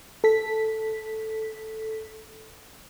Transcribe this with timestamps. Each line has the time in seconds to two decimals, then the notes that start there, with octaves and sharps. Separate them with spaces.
0.24 A4 B6